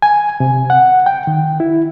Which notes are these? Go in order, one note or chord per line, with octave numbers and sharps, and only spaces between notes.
G#5
C3
F#5
G5
D#3
E4